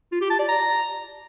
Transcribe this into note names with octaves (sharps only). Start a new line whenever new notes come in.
F4
G4
A5
D5
A#5